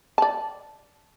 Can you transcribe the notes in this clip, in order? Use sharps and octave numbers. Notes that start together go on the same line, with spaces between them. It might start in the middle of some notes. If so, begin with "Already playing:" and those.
D5 A5